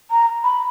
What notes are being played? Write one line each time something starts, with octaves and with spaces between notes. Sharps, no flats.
A#5
B5